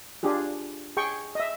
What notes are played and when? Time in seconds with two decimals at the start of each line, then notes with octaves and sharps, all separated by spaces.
0.23 D4 F4 G4 G#4
0.97 G#4 G5 C#6
1.35 D#5 E5